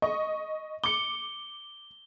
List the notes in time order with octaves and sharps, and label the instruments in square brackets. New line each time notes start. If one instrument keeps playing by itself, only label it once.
[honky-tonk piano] D#5 C#6
[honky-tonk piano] D6 C#7 [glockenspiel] G7